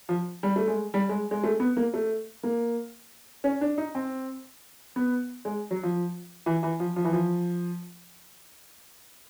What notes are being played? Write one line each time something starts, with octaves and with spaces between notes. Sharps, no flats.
F3
G3
A3
G#3
G3
G#3
G#3
A3
B3
A#3
A3
A#3
C#4
D4
D#4
C4
B3
G#3
F#3
F3
E3
E3
F3
F3
E3
F3